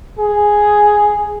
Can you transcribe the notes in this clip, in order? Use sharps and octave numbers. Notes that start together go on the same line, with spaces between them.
G#4